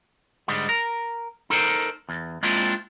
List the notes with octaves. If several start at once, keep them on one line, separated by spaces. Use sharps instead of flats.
G#2 D3 G3 G#3
A#4
D#4 A4 A#4 C5
E2
G#3 A#3 C4 D4 E4 F4